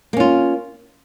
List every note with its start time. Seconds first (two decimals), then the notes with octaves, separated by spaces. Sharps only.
0.13 A#3
0.17 C#4
0.20 F4